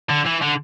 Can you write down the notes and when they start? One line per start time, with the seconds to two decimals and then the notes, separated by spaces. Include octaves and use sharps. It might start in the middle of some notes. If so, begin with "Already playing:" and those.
0.09 D3
0.26 E3
0.41 D3